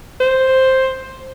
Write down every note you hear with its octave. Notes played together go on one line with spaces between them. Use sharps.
C5